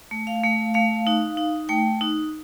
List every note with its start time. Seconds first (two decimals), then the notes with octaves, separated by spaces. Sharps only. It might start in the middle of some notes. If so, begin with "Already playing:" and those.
0.11 A3
0.27 F5
0.43 A3
0.74 A3 F5
1.07 D#4
1.37 D#4
1.69 A3 G5
2.01 D#4